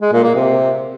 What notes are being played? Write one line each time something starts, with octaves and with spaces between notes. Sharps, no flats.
G#3
A#2
A#3
C3